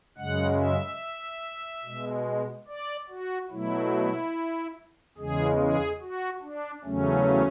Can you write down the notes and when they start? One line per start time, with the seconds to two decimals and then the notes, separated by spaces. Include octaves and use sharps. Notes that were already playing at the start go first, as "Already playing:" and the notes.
0.18 F#2 C#3 G#3 F#5
0.59 E5
1.84 B2 G#3
2.68 D5
3.09 F#4
3.51 B2 F#3 A3 E4
5.18 E2 C#3 G#3 G#4
5.59 G#4
6.01 F#4
6.42 D4
6.84 E2 C#3 F#3 A3 C#4